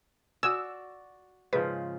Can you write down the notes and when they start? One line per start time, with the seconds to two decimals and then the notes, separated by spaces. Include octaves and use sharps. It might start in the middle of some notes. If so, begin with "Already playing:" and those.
0.43 F#4 D5 G#5 D#6 E6
1.53 G#2 C#3 F3 B4